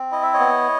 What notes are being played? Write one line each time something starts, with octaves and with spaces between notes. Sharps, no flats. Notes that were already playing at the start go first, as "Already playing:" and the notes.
Already playing: C4
E4 D#5
E5
C#5 D#5
B3